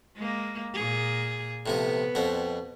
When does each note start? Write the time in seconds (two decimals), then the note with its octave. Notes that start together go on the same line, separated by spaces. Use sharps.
0.16 G#3 A#3
0.74 A#2 G#4
1.66 A2 C3 F3 B3
2.15 F2 B2 C4